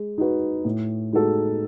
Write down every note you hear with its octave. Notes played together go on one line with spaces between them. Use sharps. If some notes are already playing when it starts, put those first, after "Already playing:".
Already playing: G#3
D#4 F#4 B4
A2
G#3 D#4 F#4 A4